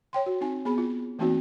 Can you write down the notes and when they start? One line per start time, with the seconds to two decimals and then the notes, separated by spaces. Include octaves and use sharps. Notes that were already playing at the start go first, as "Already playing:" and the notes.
0.13 C#5 G5 C6
0.26 F#4
0.41 C4 D#4 G#5
0.65 B3 G#4 B5
0.78 F4
1.19 E3 A3 A#3 C4 D#4 F#4